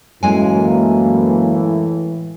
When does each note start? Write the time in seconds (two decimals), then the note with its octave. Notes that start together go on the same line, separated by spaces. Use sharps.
0.23 F#2 A2 E3 G#3 A#3 G#5